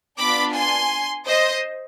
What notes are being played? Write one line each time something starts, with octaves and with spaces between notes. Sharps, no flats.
B3 D4 F4 B5 D6
G#5 C6
C5 D#5